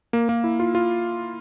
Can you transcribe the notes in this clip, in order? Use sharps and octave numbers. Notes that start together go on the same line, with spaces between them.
A#3
A#3
E4
F4
F4